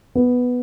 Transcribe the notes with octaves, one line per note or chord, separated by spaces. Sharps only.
B3